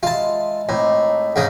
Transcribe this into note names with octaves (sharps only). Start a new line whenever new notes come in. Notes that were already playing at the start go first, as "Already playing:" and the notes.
G#3 F4 E5 A5 B5
A2 C4 D#4 D5
G#2 C#3 D#4